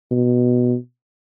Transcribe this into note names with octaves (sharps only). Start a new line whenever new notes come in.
B2